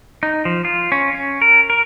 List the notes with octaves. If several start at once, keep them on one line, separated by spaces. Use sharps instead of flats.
D#4
F3
F4
C#4
C#4
A#4
A#4